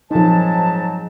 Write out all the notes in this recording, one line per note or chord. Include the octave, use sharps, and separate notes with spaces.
G#2 F3 F#3 D#4 A5